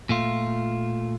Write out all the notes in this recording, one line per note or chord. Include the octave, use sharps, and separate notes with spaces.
A#2 A3 F4